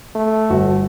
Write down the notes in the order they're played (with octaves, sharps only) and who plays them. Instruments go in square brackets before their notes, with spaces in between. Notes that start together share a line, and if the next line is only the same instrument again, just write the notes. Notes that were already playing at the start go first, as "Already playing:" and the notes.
[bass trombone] A3
[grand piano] G1 F#4